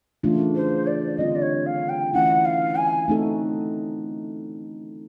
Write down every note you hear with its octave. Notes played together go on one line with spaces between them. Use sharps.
C#3 E3 A3 D4 F4
C5
D5
D3 G3 C4 F4 D#5
D5
C#5
F5
G5
E3 A3 C#4 E4 F#5
F5
G#5
A3 C4 D#4 F#4 A4